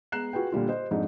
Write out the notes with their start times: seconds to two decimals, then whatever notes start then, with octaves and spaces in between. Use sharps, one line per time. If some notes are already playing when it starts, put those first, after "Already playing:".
0.12 G#3 B3 A#5 F#6 C7 E7
0.33 F4 F#4 G#4 B4 G5
0.52 A#2 D3 G3 F4
0.69 C5 D#5
0.91 F2 G#2 D4 D#4